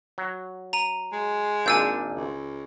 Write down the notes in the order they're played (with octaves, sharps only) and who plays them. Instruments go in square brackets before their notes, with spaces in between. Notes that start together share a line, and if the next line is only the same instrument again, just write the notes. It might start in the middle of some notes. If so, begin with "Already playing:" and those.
[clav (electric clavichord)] F#3
[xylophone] A#5 D#7
[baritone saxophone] G#3
[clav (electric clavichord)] G#1 A#2 D4 [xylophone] G#5 E6 G6
[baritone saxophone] C#2